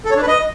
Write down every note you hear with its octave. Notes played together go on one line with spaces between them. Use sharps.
A4
C#5
D4
B4
D#5